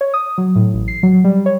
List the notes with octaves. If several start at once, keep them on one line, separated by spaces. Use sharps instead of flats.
C#5
D#6
F#3
A2
A1
C7
F#3
G3
C#5